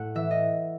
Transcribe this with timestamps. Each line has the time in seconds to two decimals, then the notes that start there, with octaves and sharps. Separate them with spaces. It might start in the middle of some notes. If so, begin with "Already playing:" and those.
Already playing: A2 A3 F#5
0.15 E3 E5
0.31 D#5